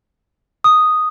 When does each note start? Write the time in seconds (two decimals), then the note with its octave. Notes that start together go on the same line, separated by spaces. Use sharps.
0.64 D#6